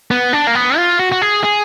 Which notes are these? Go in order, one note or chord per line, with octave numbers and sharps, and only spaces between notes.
B3
D4
A#3
B3
F4
F#4
F#4
G#4
G#4